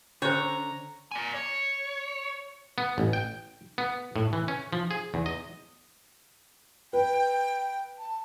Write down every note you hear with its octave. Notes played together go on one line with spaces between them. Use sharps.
D3 C#4 C5 C#5 A#5
D5 G#5
C#5
B3
A1
G5
B3
A2
E3
C#4
F3
G#4
E2
D#5
B4 G5
A5